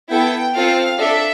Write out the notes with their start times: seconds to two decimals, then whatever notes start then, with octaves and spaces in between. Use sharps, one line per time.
0.09 B3 E4 A4 G5
0.54 C4 F4 A4 F5
1.00 D4 A4 E5